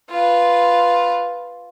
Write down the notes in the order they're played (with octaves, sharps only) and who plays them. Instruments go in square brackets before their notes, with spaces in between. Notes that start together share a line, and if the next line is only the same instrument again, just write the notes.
[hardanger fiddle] F4 B4